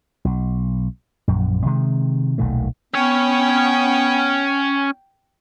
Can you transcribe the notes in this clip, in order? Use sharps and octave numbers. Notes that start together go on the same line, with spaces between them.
B1
A#1 F#2
C3 D#3 G#3
D#1 B1 D#3 A3
B3 C#4 C#5 G5